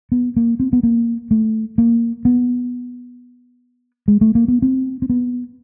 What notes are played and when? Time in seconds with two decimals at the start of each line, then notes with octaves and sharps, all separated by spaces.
0.12 B3
0.36 A#3
0.60 C4
0.73 B3
0.83 A#3
1.31 A3
1.78 A#3
2.25 B3
4.08 G#3
4.21 A3
4.35 A#3
4.48 B3
4.62 C4
5.02 C4
5.10 B3